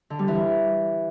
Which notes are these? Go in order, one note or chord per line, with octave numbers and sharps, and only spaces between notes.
D3
G3
E3